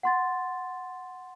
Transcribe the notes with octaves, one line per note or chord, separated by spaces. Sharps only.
F#5 C6 A6